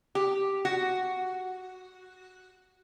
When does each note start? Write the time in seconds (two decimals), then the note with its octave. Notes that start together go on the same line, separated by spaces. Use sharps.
0.15 G4
0.65 F#4